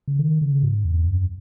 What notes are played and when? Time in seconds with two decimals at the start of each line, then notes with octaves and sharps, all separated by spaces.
0.08 C#3
0.19 D#3
0.41 C#3
0.63 G#2
0.85 E2
1.07 F#2